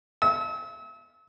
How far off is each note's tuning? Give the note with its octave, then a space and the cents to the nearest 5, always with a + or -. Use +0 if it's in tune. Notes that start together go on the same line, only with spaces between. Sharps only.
E6 -40